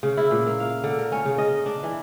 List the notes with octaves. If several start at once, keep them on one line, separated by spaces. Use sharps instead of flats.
C#3
E4
A#2
A#3
F5
D3
A#4
C#4
C#3
D#5
D4
E3